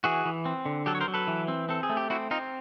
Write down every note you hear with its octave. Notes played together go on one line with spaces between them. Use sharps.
E3 F#4 G#4
E3
C4
D3
F#3 G4 A4
C#5
A#4 C5
F#3
A4 B4
E3
C4
C4 A4
G#4
A3
G4
C4 E4 F#4
C4 D#4 F4